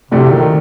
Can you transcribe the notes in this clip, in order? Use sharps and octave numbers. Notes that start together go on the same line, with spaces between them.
A#1 A2 C3 F#3 A3 D4
D#3